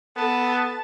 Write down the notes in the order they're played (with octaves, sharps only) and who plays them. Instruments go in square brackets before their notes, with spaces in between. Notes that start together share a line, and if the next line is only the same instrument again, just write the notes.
[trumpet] B3 [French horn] A4 [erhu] A5